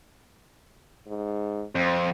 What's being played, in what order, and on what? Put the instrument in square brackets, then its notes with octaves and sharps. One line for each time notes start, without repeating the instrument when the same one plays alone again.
[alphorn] G#2
[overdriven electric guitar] F2 [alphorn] C4